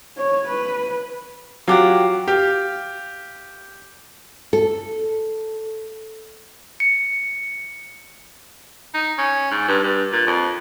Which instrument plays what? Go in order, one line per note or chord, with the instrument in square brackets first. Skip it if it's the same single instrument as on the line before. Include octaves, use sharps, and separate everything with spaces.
[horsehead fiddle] C#5
B4
[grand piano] F#3 [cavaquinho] F4 G4 F#5
[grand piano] G4 [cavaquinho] F5
[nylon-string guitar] A4
[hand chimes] C#7
[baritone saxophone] D#4
C#4
G#2
G2
G2
A#2
F2